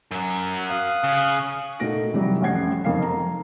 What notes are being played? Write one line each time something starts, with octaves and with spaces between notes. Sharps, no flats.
F#2 F#3
F5 D#6 F#6
C#3
A#2 A3 D#4 F#4 A#6 D7
C3 E3 F#3 G3
A1 F2 C#4 F#5 G#6 C7
F#1 F2 A#3 D#4 F5 C7
A#5